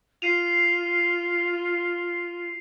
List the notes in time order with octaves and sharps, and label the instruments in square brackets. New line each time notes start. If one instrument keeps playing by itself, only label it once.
[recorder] F4 [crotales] C7 D#7 F7